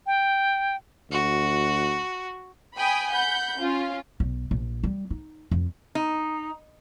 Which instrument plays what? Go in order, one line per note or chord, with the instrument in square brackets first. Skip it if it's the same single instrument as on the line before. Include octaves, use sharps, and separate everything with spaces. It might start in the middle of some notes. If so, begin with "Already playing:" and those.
[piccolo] G5
[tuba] D2 [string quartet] F#4
[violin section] G5 G#5 B5 D#6
F#5 B5 G6
C#4 F4
[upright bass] B1
A#1
G3
D#4
F2
[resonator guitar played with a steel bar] D#4